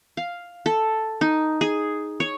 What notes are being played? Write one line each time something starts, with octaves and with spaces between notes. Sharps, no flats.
F5
A4
D#4
G#4
C#5